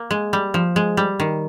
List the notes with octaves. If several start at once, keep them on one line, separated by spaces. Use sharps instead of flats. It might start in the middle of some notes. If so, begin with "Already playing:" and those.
Already playing: A#3
G#3
G3
F3
G#3
G3
D#3